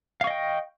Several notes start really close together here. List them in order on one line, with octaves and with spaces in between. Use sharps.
F5 C#6 D#5 G5